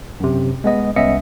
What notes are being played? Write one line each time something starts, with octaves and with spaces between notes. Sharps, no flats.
F#2 C3
G#3 B3 D#5
C2 B3 C#4 D#5 E5 C#7